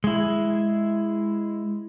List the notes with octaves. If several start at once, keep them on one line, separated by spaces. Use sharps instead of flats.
G#3 E4